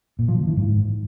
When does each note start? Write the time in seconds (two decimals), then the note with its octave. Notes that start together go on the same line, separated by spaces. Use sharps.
0.19 A#2
0.28 F3
0.38 D3
0.47 E3
0.57 G#2